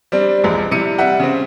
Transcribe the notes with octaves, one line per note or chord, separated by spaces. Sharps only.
G3 C4 D4
E1 A#1 G#3
C3 G3 E4 C#7 D#7
G3 E5 F#5
C#3 C4